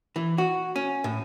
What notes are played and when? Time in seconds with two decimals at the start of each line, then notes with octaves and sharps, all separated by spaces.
0.16 E3
0.38 F#4
0.76 C#4
1.04 A2